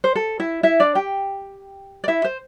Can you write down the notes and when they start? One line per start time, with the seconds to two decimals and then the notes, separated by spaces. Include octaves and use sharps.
0.04 C5
0.15 A4
0.40 E4 E5
0.63 E4 E5
0.80 D4 D5
0.95 G4 G5
2.04 D5
2.08 E4 E5
2.24 C5